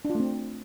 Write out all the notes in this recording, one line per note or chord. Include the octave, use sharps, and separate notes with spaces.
D4
F4
A3
C4